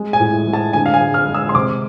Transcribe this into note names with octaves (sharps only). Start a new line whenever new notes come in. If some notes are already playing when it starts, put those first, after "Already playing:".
Already playing: G#3
G#5
A2
G#3
A5
D3 G#5
F5
G#5
G#3
F6
G#3
E6
C6
C3 D6